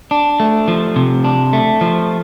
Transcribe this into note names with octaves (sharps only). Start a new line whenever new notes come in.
D4
A3
F3
C3
D4
A3
F3